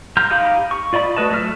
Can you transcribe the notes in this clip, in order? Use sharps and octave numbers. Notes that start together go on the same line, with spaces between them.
A#5 C6 F6 G6
D#4 G4 F5 A#5 B5
C#6
F4 D5 D#5 B5
A3 F#4 B4 D#5 A5
F#3 A3 B4 E5 F6